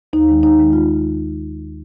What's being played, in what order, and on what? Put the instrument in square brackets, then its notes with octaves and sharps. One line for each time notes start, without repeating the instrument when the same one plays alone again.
[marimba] D#2 D#4
D#3 G#3
D#2 D#4
D#3 G#3
F4